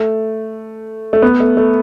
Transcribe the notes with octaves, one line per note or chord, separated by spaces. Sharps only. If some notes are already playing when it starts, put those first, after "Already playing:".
Already playing: A3
A3
B3
A3
A3